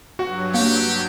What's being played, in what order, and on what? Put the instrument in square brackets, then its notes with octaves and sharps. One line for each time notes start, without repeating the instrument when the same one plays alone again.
[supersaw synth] G2 F#3 [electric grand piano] F#4 F#5
[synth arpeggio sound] A#3 [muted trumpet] G4